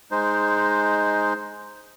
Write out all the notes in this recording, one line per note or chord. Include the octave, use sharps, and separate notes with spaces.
G#3 D#4 C5